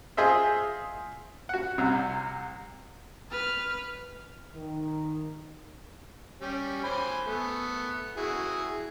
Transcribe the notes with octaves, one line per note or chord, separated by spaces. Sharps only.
F4 G#4 C5 D#5 E5
F#4 F#5
C2 C3
B4 F6
D#3
G3 C#4 G4
C5 G#5 B5
A3 B3
E4 F#4 G#4